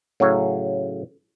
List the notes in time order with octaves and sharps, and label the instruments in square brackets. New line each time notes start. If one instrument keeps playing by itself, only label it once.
[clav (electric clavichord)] A2 C#3 F#3 C#5